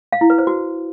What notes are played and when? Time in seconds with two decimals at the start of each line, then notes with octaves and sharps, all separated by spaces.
0.12 F5
0.21 E4
0.30 B4
0.38 C5
0.47 F#4